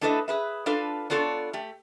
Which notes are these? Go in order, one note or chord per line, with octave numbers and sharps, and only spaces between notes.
A3 D4 E4 A4 B4 D#5
G#4 B4 E5
D4 F4 A4 B4 F5
B3 D4 F4 A4 B4 C#5
A3 G4